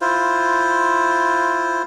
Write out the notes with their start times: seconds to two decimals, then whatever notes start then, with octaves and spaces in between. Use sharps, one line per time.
0.01 E4 F4 C5